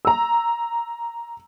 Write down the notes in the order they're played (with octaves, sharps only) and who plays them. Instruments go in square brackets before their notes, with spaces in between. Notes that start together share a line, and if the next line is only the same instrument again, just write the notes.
[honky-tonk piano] A#5 E6